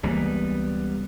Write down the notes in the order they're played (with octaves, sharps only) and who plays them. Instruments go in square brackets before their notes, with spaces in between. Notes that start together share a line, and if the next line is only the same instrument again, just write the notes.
[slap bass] C#2 E3 A#3 [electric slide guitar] G3 B3